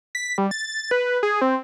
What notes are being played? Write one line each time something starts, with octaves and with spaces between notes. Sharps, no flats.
B6
G3
A6
B4
G#4
C4